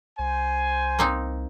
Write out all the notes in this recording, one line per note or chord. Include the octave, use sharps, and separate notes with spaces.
C2 C5 G#5
A#3 C4 D#4